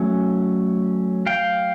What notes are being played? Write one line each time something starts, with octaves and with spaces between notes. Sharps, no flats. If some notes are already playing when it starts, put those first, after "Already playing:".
Already playing: F#3 A3 C#4
F5 G5